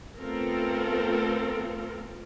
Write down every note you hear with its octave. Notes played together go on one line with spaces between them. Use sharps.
A3 B3 C4 F4 A4 A#4